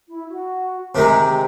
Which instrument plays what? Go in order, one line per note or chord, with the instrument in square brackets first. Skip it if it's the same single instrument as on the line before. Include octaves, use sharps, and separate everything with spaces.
[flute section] E4
F#4
[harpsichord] C3 D#3 G#3 [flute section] G4